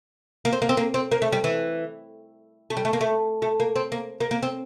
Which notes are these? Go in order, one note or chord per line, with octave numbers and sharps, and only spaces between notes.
A#3
C4
A#3
C4
A#3
C4
A#3
A3
G3
E3
A3
G3
A3
A#3
A3
A3
A#3
C4
A#3
A#3
A#3
C4